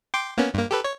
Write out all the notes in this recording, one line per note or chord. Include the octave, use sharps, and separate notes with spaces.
G5 C6 D6
A#3 B3 C#4
G2 A#3
G4 A4 B4
C#5